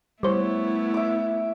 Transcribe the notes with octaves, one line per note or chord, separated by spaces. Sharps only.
G3 A3 B3 E4 C5 C#5
E5 D6